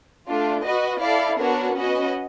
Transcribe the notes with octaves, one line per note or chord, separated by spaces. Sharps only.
A3 D4 F4
F#4 B4 D#5
E4 A4 D5 F5
B3 D4 F#4 A#4 C#5
C#4 F#4 B4 D#5